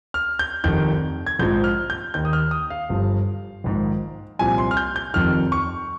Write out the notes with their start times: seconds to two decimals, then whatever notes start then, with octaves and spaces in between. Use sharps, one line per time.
0.14 F6
0.39 G6
0.64 F1 F2 D#3 G6
1.27 G#6
1.39 A#1 G#2 F3 G6
1.64 F6
1.90 G6
2.14 D#2 D#3 G6
2.25 D#6
2.33 F6
2.51 D#6
2.70 F5
2.89 G1 G2 F3
3.64 A#1 G#2 D#3
4.39 C2 A#2 F3 G#5
4.58 C6
4.71 F6
4.77 G6
4.96 G6
5.14 F1 F2 D#3 F6
5.52 C#6